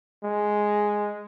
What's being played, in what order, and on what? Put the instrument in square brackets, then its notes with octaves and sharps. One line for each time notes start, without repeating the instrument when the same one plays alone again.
[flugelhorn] G#3